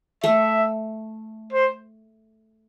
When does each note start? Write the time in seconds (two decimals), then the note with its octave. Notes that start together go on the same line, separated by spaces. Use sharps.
0.24 A3 E5
1.53 C5